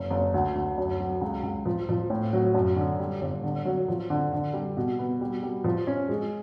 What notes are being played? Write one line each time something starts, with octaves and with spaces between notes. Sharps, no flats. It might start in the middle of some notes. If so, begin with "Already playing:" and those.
Already playing: F#1
F#1
D2
D2
F#2
F#3
C#2
C#2
F3
F3
A2
F#3
F#2
D3
G3
G1
D3
F#3
F3
D3
D3
G3
B2
B3
G3
G3
F3
C#4
G#3